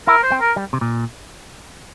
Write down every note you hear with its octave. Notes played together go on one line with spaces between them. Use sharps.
E4 A#4
C5
C4
A#4
G3
C3
A#2